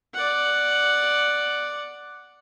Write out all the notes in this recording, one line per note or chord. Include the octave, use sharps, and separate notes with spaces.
D5 F#5